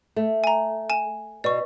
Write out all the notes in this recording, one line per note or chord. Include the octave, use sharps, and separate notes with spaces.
A3
G#5 A#5
G#5 E7
B2 D5 C#6